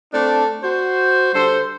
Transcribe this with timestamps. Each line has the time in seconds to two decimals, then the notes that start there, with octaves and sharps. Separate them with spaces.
0.13 A3 C4 D4
0.62 F#4 C5
1.33 D3 G3 A4 C5